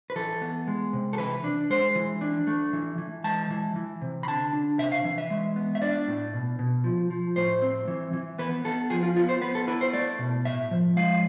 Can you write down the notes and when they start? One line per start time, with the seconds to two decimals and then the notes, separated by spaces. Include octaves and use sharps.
0.10 B4
0.16 E3 A4
0.41 B3
0.67 G#3
0.93 C3
1.13 A4
1.18 E3 B4
1.44 D4
1.70 G#3 C5
1.95 E3
2.21 D4
2.47 A3
2.73 E3
2.98 E3
3.24 G#3 A5
3.50 E3
3.76 E3
4.01 C3
4.23 B5
4.27 D3 A5
4.53 D4
4.79 C3 E5
4.92 F5
5.05 E3
5.18 E5
5.30 G#3
5.56 B3
5.75 E5
5.81 D4 D5
6.08 A2
6.33 B2
6.59 B2
6.84 F3
7.10 F3
7.36 A2 C5
7.62 C4
7.88 E3
8.13 E3
8.38 B3 B4
8.64 B3 A4
8.90 F3 G#4
9.03 F4
9.16 B3 F4
9.29 C5
9.41 B3 B4
9.55 A4
9.67 E4 B4
9.81 C5
9.93 A3 D5
10.19 B2
10.45 A2 E5
10.71 F3
10.97 G#3 F5